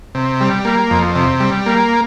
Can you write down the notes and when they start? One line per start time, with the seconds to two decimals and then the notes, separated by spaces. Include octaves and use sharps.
0.15 C3
0.41 G3
0.65 A#3
0.90 F2
1.15 C3
1.40 G3
1.66 A#3